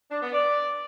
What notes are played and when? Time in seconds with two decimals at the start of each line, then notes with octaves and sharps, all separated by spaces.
0.10 D4
0.22 B3
0.33 D5